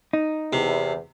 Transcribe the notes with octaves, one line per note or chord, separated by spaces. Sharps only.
D#4
E2 C3